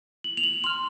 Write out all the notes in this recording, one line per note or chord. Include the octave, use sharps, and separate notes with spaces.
F#7
F7
F#7
C6 F6 F7